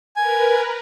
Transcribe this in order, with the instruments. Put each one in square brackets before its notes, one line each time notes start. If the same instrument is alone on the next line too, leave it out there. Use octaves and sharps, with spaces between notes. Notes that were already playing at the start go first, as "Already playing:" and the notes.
[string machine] A#4 B4 [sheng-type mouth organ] G#5